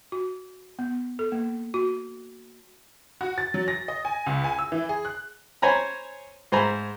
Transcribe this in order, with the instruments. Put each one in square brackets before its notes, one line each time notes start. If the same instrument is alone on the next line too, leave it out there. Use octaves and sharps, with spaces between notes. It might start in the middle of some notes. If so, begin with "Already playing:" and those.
[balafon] F#4
B3
A4
A#3
F#4
[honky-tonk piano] F#4
A6
F#3
A#6
D#5
G#5
C#2
G#5
E6
E3
G#4
F#6
[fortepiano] C5 C#5 G#5 A#5 B5
G#2 C5 G#5 A#5 B5